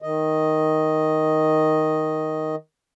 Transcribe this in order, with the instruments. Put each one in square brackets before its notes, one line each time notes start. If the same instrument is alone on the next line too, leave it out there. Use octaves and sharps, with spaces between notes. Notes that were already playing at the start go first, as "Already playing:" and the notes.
[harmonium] D#3 D#5